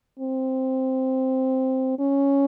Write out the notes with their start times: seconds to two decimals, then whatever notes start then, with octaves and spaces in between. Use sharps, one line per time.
0.19 C4
1.99 C#4